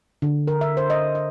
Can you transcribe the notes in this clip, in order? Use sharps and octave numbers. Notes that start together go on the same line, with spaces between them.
D3
A#4
E5
C5
D#5
D#5